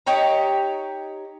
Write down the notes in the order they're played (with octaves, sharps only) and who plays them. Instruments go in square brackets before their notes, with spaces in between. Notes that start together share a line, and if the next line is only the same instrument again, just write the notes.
[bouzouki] D#4 G4 C#5 A#5